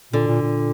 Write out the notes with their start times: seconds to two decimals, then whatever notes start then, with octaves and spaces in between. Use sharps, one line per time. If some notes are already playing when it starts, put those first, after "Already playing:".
0.13 A#2 D3
0.27 A#2
0.42 A#2